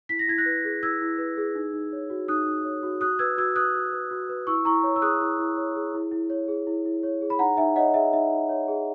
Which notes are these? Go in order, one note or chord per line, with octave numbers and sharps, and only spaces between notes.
E4 B6
A#6
E4 G#6
F#6 A#6
B4
G#4
E4 E6 G#6
E4
B4
G#4
D#4
D#4
C#5
F#4
D#4 D#6 F#6
D#4
C#5
F#4
F#4 D#6 F#6
B4 E6 G#6
F#4 E6 G#6
B4 D#6 F#6
F#4
B4
F#4
B4
E4 C#6 E6
E4 A#5 C#6
C#5
E6
G#4 D#6 F#6
E4
E4
C#5
G#4
E4
E4
C#5
G#4
E4
E4
C#5
G#4
B5
D#4 F#5 A#5
D#4 E5 G#5
C#5 D#5 F#5
G#4 E5
D#4 E5
D#4
C#5
G#4